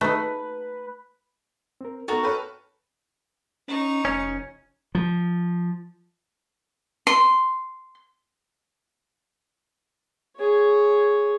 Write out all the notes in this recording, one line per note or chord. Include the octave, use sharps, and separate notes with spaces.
A3 D#4 B4
C4 A#4
B3 D#4 F#4 A4 A#4
A4 B4 C#5 G5
C#4 D#4 C#6
F1 C#4
F3
C6
G#4 C#5